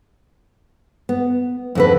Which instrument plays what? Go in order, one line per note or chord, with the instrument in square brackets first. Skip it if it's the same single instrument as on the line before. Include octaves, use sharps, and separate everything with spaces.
[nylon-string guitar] B3
F2 D3 B4